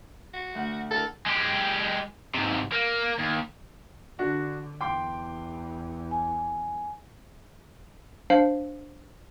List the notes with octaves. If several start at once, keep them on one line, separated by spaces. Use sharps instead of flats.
F#4
D2 F#5
D4 E4 A4 A#4
G#3 G4
G#2 C3
A#3
D#2
D3 D4 F#4
E2 G5 C6 D6
G#5
D4 C5 F5 C7